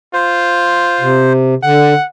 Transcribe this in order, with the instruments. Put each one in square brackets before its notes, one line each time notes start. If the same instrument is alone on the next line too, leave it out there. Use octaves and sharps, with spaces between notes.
[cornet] F4 [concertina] C5
[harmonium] C3
[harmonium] D3 [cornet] F#5